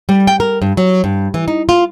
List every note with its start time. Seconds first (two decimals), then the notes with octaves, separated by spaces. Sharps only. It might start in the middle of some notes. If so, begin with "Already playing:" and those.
0.09 G3
0.27 G5
0.40 A#4
0.62 G2
0.77 F#3
1.04 G2
1.34 E3
1.48 D#4
1.69 F4